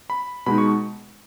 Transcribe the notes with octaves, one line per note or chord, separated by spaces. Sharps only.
B5
B2 G#3 D#4 B5
C#6